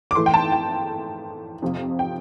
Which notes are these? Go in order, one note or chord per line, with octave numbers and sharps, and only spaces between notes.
D6
A2 E3 A3 C6
G5
A5
G5
F2 C3 F3
G5